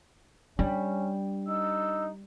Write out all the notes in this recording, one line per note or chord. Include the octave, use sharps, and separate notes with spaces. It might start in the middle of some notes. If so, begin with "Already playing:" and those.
G3 C#4 D4
D#4 E6